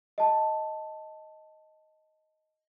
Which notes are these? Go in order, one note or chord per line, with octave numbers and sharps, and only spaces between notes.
D#5 A5